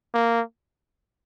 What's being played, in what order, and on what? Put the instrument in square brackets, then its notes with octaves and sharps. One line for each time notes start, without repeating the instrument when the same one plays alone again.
[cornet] A#3